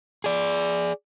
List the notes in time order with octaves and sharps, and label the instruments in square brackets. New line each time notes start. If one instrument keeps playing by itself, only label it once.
[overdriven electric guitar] G#4 D5